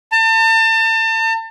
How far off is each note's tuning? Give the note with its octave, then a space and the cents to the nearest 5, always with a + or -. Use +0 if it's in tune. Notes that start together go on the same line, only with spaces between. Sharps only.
A5 +35